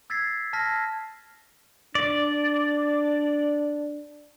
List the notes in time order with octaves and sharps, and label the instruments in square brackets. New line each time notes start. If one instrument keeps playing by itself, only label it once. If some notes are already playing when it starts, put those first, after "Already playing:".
[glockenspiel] E6 G#6 A6 B6 C7
A5 F6 A#6 B6
[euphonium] D4 [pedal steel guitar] D5